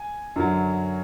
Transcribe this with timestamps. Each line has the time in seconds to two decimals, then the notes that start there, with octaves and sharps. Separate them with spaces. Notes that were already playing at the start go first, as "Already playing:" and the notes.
Already playing: G#5
0.36 F#2 D3 F#3